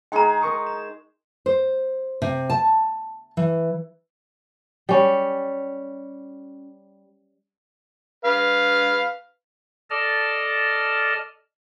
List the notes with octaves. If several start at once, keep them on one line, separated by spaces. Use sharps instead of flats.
G#3 D#4 G#4 G5 A#5
A#4 C#6 D#6
E7
C5
C3
A5
E3
G3 C#4
B4 F5
A4 D5 D#5 A5 F6